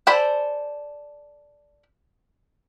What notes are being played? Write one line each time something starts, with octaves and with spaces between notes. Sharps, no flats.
A4 C5 D5 G#5 B5